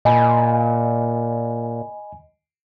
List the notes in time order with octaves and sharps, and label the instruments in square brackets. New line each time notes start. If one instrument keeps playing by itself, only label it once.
[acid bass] A#2 [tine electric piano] D#5 G#5 B5